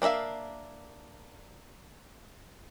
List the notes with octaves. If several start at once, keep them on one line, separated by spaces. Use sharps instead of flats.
A#3 D4 A#4 E5 F5